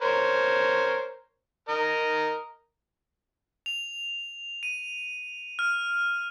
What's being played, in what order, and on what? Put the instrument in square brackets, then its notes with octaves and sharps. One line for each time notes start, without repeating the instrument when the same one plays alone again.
[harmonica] A#4 C5 C#5
A#4 D#5
[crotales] F7
D#7
F6